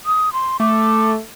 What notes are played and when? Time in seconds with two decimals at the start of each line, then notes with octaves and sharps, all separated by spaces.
0.06 D#6
0.33 C6
0.60 A3 D6